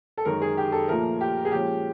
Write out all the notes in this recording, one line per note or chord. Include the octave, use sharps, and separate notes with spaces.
A4
F#2 D#3 G#3 A#4
G#4
G4
A4
A#2 F3 A3 A#4
G4
G#4
A#2 F3 G#3 C#4 G4